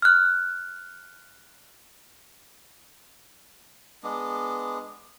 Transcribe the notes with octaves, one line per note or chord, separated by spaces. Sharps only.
F6 F#6
G#3 B3 D4